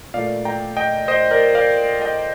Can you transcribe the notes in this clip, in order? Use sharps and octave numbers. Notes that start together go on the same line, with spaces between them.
A#2 A3 D5 F5
G5 A#5
D#5 G5
C5 D#5
A#4 D5
D5 F5
D#5 G5